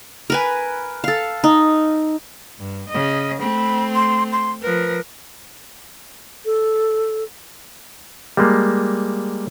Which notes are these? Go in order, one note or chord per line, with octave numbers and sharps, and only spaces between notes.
A#4 B4 G#5
A4 F5
D#4
G2
C#3 D#5
A3 C4 B5
C6
C6
F3 A#4 B4
A4
G3 G#3 A#3